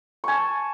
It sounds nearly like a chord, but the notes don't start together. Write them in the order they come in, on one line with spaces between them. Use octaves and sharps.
C#6 G#5 A5